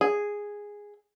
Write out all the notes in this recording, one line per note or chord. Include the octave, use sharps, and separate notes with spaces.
G#4